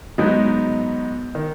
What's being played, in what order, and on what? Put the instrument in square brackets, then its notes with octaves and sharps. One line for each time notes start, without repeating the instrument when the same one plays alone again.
[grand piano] G#2 F#3 B3 D#4
D#3